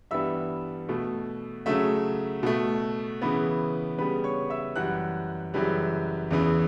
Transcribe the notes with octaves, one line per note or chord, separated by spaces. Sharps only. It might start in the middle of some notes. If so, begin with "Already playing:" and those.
G2 E3 G3 B3 E5 E6
B2 A3
C#3 F#3 A3 E5 E6
B2 A3
C#3 E3 B3
C#3 G3 B3 B4 B5
C#5 C#6
E5 E6
F#2 E3 G3 F#5 F#6
F#2 C#3 E3 G3
E2 C#3 E3